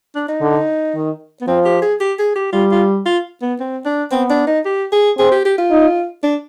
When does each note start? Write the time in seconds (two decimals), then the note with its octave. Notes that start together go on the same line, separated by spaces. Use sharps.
0.15 D4
0.28 D#4
0.41 D3
0.94 D#3
1.41 B3
1.47 F3 C4
1.65 G4
1.82 G#4
2.00 G4
2.18 G#4
2.35 G4
2.53 G3 F4
2.71 F4
3.05 F4
3.41 B3
3.60 C4
3.85 D4
4.11 B3 C4
4.30 D4
4.47 D#4
4.65 G4
4.92 G#4
5.17 C4 G#4
5.31 G4
5.45 G4
5.58 F4
5.71 D#4
6.23 D4